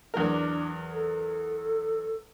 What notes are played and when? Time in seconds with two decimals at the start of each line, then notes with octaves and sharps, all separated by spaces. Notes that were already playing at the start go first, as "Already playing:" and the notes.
0.14 E2 F#3 D4 A#4
0.92 A4